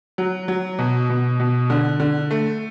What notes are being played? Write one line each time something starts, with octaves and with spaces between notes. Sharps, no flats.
F#3
F#3
B2
B2
B2
D3
D3
A3